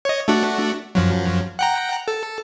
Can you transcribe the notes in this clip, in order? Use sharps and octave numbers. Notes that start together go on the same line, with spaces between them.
C#5 D#5
A3 D4 F#4
F#2 F3 F#3
F#5 G5 A#5
A4